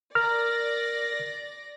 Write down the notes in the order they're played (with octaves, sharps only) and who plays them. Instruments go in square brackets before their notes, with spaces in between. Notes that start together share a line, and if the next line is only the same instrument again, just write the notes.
[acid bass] A#4 [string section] D5 A#6 [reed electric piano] F6